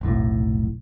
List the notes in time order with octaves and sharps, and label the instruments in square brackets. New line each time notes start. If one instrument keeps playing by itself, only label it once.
[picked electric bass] F1 B1 A2